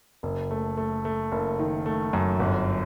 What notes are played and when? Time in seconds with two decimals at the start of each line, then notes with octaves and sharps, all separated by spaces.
0.23 F#1
0.51 A3
0.77 A3
1.05 A3
1.32 F#1
1.59 D#3
1.86 A3
2.13 F#2
2.39 G1